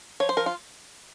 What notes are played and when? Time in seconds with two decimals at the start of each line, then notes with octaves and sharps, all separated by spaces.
0.20 F3 C#5
0.29 C5
0.37 F3 A#4
0.46 F4